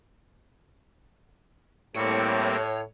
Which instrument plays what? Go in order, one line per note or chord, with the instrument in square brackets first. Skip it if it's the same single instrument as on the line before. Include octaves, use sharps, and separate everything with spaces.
[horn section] A2 [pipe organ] G3 A#3 C4 [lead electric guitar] C#5